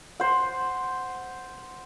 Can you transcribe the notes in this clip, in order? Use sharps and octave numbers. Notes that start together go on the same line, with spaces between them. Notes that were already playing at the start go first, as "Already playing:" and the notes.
C5 F#5